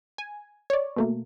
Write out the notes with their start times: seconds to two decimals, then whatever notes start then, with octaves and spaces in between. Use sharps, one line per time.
0.18 G#5
0.70 C#5 D5
0.96 B2 A3 A#3